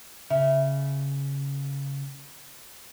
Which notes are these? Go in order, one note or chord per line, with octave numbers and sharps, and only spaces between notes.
C#3 E5